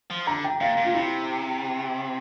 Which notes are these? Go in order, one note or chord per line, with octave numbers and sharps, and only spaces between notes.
F3
D3 A#5
G5
A#2 F5
A#2
F4
C3 E4